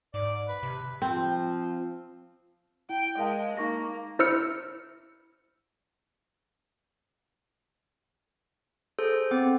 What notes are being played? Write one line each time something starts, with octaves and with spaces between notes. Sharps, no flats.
G#2 D5
B4
C3
F3 C4
E4 G5
G#3 A#4 F5 A5
A#3 D#4 C#6 A#6
E4 C5 E6 F6 C#7
G#4 A4 C5
B3 C4 D6